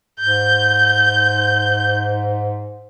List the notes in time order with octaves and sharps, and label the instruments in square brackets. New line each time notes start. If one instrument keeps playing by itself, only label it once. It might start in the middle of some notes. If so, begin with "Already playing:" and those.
[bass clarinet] G#2 [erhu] G6